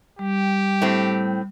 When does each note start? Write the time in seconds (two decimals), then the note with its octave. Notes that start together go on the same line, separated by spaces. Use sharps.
0.19 G3 G4
0.82 A2 C4